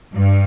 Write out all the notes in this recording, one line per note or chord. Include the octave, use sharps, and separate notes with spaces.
G2